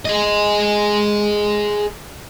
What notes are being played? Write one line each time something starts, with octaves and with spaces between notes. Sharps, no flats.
G#4 D#5